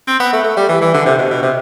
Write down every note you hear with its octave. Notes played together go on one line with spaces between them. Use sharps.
C4
B3
A3
A3
G3
E3
E3
D3
C3
B2
B2
C3